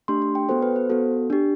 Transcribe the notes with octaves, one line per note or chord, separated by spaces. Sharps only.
A3 D4 G4 C6
C6
G5
B3 F#4 A4 C5
B4
C5
B3 F#4 A4
D4 G4